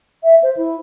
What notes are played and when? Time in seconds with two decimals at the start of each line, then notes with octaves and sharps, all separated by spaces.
0.24 E5
0.43 C5
0.57 E4